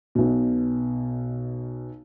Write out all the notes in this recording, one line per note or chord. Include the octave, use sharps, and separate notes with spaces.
B1 B2